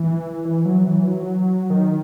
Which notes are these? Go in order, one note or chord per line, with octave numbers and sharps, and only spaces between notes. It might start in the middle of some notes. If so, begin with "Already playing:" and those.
Already playing: E3
E3
F#3
E3
F#3
D#3